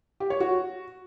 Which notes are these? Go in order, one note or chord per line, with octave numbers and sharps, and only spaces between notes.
G4
C#5
F#4